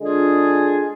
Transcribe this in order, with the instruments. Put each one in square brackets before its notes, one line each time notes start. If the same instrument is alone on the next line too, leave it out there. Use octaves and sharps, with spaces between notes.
[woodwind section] D3 G#3 D4 F4 G#4